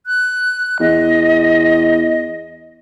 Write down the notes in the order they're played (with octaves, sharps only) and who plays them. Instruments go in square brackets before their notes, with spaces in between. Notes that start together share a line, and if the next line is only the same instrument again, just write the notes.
[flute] F#6
[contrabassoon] E2 [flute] D#5